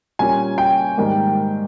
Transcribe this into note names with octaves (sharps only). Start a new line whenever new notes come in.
A#2 G3 A#3 C#4 F4 G#5
G5
G#2 D#3 G3 A#3